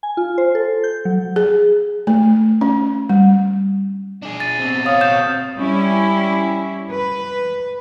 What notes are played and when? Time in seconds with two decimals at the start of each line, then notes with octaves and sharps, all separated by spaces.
0.03 G#5
0.17 F4
0.38 C5
0.55 A4
0.84 G6
1.05 F#3
1.36 G#4
2.07 A3
2.61 C#4
3.09 G3
4.23 D4 G#4
4.40 A6 D#7
4.60 B2 C4
4.86 C#5 F5 D#6
5.01 G6 E7
5.58 G3 C#4 E4
6.91 B4